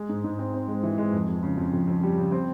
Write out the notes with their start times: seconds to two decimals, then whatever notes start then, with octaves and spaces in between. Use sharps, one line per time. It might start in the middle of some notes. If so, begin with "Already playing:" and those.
Already playing: G#3
0.09 G#2
0.24 G#2
0.39 C4
0.54 C4
0.68 G#3
0.83 E3
0.98 G#3
1.13 F2
1.29 F2
1.43 C#3
1.58 F2
1.73 F2
1.87 F2
2.03 G3
2.17 C#3
2.32 C4